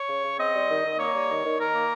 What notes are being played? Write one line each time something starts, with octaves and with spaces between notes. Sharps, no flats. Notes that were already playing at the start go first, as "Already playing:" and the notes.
Already playing: C#5
C#3
C#3
C4 D#5
G3
D#3
D#3
A#3 C#5
G3
D#3
D#3
D#3 A#4
A#3